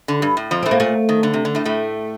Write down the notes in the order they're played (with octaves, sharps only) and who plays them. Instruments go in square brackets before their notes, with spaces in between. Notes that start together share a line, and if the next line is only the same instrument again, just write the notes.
[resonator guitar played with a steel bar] D3
G2
A2
F2 F3
[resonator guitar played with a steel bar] A2 A3 [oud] C4
[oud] A#3
[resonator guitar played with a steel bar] A#2 [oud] A3
[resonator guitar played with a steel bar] D#3
D3
C3
D3
A2 A3
A2 A3